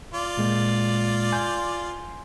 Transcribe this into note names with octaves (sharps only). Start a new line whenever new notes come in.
F4 D5
A#2 G#3 A#3
G#5 C6 G6